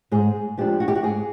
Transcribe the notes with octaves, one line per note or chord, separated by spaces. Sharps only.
G#2 G#4
F3 G#3 B3 D4 G4
F#4
G4
F#4
G#2 G#4